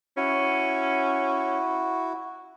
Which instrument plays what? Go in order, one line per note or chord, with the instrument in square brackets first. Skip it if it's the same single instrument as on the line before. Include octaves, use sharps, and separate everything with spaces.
[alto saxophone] C#4 [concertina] E4 F#4